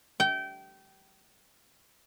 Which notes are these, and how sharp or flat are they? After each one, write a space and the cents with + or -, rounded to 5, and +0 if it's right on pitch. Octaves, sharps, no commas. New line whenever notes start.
G5 -25